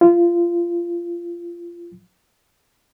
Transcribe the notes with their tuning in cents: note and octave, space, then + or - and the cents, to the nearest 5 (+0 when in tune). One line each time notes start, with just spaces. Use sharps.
F4 -25